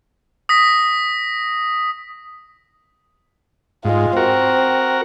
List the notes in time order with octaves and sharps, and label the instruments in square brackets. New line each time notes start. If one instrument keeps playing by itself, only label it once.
[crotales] D#6 A#6 B6
[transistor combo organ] G#2 [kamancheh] G#3 F4
[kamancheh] C4 [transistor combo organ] F#4 A#4